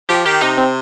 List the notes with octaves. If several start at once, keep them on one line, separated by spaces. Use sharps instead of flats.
F3 G4
D#3 G4
C3 D#4
C4